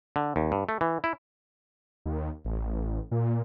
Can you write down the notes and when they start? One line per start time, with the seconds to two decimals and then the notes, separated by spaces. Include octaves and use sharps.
0.16 D3
0.36 D#2
0.52 G2
0.69 A3
0.81 E3
1.04 E4
2.06 D#2
2.45 A1
3.11 A#2